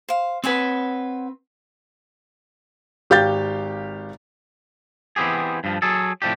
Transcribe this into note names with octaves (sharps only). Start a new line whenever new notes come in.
C5 F5
C4 B4 C#5 F#5 G#5
G#1 G4 F5 G6 A6
E3 B3 C4 G4 G#4
G2 F3
F#3 G#4 A4
A2 C3 F3 D4 G4